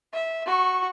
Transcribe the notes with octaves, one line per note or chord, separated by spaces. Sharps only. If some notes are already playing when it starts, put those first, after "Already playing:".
E5
F#4 C#6